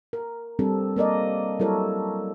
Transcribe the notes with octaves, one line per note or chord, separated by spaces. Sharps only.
A#4
G3 C4 D4 A4
A#3 A#4 D5 D#5
F#3 G3 E4 A4 A#4 C#5